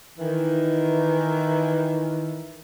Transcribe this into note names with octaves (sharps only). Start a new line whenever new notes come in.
D#3 E3